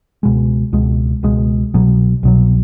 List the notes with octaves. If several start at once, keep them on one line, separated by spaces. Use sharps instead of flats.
C#2 B2 G#3
C#2 B2 G#3
C#2 B2 G#3
C2 B2 F#3
C2 B2 F#3